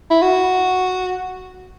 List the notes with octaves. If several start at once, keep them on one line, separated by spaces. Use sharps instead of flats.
E4
F#4